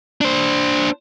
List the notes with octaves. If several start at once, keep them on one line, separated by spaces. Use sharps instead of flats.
D4 C5